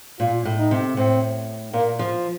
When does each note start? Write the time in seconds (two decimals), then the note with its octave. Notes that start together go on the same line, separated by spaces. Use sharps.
0.19 A#2 F4
0.45 A2
0.59 D#4
0.71 C3
0.97 A2 C4
1.73 A#2 A#3
1.99 F3